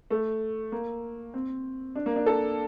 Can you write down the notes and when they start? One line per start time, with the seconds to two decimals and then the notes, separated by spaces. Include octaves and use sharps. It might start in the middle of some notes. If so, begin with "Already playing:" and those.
0.11 A3
0.72 A#3
1.34 C4
1.96 D4
2.06 A#3
2.16 D4
2.26 A4